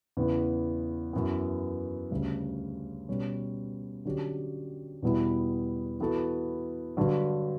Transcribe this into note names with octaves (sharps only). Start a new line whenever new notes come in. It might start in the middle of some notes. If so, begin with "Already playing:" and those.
E2 C#3 E3 B3
F#2 E3 B3
D2 C#3 G3
B2 G3 C#4
D3 F#3 C#4 G4
E2 B2 G3 B3 E4
E3 B3 F#4 A4
G2 D3 F#3